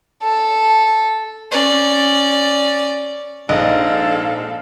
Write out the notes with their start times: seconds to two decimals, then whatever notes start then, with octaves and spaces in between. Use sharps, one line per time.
0.23 A4
1.52 C#4 D5
3.49 A#1 G#2 A4 D#5 F5